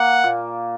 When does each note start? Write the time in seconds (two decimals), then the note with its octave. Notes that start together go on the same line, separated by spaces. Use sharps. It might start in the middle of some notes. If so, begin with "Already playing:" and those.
Already playing: A#3 F#5
0.24 A#2